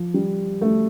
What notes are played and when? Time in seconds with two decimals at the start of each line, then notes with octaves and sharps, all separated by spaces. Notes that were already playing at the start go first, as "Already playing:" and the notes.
Already playing: F3
0.14 G3
0.61 A3